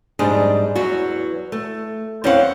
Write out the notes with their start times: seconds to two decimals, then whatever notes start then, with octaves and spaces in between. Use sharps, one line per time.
0.19 F2 G#2 G3 D4 G#4
0.75 E2 F#3 F#4
1.52 A3
2.24 E2 C4 C#4 C5 F5 F#5